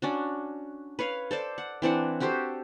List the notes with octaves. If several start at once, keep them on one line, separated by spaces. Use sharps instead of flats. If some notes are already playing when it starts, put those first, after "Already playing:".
C#4 D4 F#4
B4 C#5 F5
A4 C5 D5
F#5
E3 C4 D4 F#5
F#4 G4 A4 C5